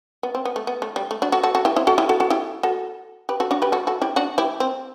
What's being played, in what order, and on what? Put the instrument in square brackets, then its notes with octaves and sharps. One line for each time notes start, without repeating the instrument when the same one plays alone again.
[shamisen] B3
C4
B3
A3
B3
A3
G3
A3
D4 F#4
F#4 A4
F#4 A4
F#4 A4
E4 G4
C4 E4
F#4 A4
E4 G4
F#4 A4
F#4 A4
E4 G4
F#4 A4
G4 B4
F#4 A4
D4 F#4
G4 B4
F#4 A4
F#4 A4
E4 G4
D4 F#4
E4 G4
C4